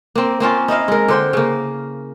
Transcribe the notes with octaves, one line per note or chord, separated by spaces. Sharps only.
A#3 C4
A#3 C4 C#4 F4
D#4 E4 D#5 F5
G#3 A#4
D3 C5 G5
C#3 A#3